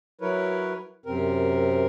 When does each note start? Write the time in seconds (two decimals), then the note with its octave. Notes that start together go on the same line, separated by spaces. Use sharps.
0.21 F#3 E4 A#4 B4 C#5
1.06 F#2 C3 C4 A#4